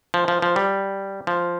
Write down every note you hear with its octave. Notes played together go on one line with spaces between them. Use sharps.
F3
F3
F3
G3
F3